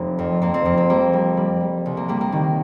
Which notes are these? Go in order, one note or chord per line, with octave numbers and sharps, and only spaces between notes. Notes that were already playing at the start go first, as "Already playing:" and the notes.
Already playing: F1 A#3 C4
F2
F2 A#3
C4
F2 A#3
C4
G3 A#3
G3
G3
G3
C2
A#3
G3 A#3
A#3
D#3